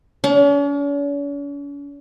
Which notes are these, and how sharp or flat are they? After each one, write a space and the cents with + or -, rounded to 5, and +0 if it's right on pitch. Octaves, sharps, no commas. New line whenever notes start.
C#4 +45